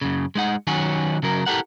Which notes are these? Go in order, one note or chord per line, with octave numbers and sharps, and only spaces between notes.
F#2 C#3
G#3 D#4 F#5
D#3 F#3 C#4 F#4 G#5
C#3 F#3 A#4
E4 G4 A4 A#4 F#5